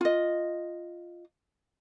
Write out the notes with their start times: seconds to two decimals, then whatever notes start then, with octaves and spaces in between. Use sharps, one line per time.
0.01 F4 D#5